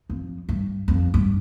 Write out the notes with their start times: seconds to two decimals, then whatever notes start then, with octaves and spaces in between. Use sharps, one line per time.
0.10 F2
0.49 G2
0.88 F2
1.14 G2